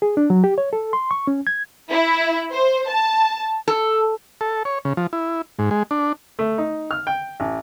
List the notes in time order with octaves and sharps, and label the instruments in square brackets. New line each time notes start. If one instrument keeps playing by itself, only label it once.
[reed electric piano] G#4
D4
F#3
G4
C#5
A4
C6
C#6
C#4
G#6
[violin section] E4
C5
A5
[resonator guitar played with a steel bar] A4
[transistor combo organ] A4
C#5
C#3
F3
E4
G#2
G#3
D4
[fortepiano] A3
D#4
F6
G5
A1